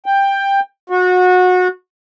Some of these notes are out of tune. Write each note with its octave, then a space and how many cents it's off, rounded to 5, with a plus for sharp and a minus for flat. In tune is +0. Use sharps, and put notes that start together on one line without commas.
G5 +10
F#4 -25